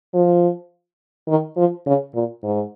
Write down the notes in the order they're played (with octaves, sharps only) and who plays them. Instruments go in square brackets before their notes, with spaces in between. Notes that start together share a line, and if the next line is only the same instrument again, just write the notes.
[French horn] F3
D#3
F3
C#3
A#2
G#2